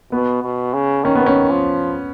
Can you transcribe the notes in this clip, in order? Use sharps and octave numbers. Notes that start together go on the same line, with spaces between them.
B2 B3
B2
C#3
D#3 C#4
B3
C#4
F3